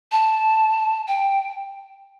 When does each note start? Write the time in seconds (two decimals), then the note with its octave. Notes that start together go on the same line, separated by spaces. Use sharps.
0.12 A5
1.08 G5